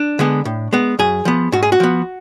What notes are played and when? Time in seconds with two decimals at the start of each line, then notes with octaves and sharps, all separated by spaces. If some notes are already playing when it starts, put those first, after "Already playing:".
Already playing: D4
0.19 D3 G#3 B3
0.45 A2
0.73 G#3 B3
0.99 F#2 G#4
1.25 F3 B3
1.52 G#2 F#4
1.63 G#4
1.72 F#4
1.80 F3 B3